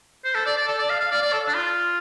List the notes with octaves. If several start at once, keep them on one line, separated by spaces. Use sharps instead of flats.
C5
A4
D5
D5
A4
D5
F5
F5
D5
D5
A4
D4
F4